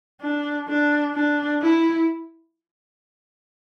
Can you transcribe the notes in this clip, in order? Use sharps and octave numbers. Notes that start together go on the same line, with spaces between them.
D4
D4
D4
E4